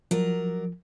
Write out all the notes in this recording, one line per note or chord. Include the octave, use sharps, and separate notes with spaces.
F3 F#3 A#4 D5